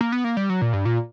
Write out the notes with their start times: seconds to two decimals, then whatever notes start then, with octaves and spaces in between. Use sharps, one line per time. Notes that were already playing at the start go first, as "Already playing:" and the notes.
0.01 A#3
0.12 B3
0.24 A#3
0.37 G3
0.50 F#3
0.62 A#2
0.73 G2
0.85 A#2